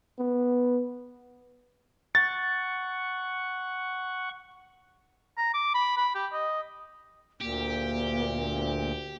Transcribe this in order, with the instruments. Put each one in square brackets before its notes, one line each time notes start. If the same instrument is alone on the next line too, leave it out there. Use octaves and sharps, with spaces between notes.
[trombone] B3
[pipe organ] F#5 C#6 [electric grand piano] A6
[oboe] A#5
D6
B5
B5
G4
D#5
[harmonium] D2 A#2 [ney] A#3 [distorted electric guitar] G4